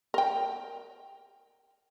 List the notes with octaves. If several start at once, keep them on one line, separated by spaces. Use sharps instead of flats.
A#4 G5